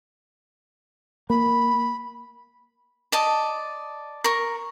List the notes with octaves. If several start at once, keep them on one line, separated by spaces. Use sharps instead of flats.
A#3 B5
D5 D#5 A5
A#4 C#6